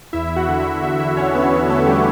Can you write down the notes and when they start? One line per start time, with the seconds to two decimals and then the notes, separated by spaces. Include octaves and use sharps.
0.13 E2 E4 E5
0.36 F#4 F#5
0.48 D3
0.60 E4 E5
0.83 E2 E4 E5
1.00 E4 E5
1.17 D3 C#4 C#5
1.35 B3 B4
1.52 E2 B3 B4
1.69 A3 A4
1.86 D3 G3 G4